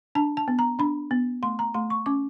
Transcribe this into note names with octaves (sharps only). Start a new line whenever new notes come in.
D4 A5
A5
B3
A#5
D4 B5
B3
A3 C6
A#5
A3 C6
C#6
C#4 D6